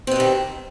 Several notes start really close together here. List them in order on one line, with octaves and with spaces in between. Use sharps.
C4 B2 G3 D#3